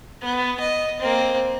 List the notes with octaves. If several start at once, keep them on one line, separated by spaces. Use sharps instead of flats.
B3
D#5
A#3 C4